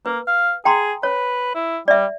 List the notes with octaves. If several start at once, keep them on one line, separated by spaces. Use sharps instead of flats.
A#3 B4
F5
G#4 G5 A#5 C6
B4 C#5
E4
G3 D5 E5